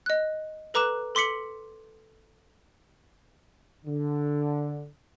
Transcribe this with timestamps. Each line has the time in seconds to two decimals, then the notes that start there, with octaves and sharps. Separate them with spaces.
0.06 D#5 F#6
0.74 A4 B4 A#5 D6 F#6 E7
1.15 A4 C6 D6 B6 C#7 F#7
3.85 D3